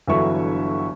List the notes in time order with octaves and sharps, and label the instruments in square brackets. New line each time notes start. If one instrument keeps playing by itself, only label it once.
[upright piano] G1 D3 E3 F#3 E5 C#6